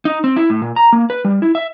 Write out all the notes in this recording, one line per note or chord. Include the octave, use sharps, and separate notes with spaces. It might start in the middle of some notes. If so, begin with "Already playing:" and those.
D#4
C4
E4
A2
A#2
A#5
A#3
B4
G3
E4
E5